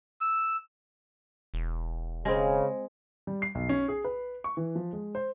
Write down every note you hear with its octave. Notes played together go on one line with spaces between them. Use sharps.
E6
E1
C#3 G#3 C4
G3
C7
B1
C#4
G#4
B4
C#6
E3
F3
G#3
C5